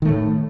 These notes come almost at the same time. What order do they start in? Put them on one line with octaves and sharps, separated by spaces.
D#3 A3 A2